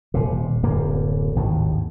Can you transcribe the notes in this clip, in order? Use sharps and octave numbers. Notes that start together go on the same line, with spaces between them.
D#1 C3
D1 F#2 A#3
G#1 D#2 A2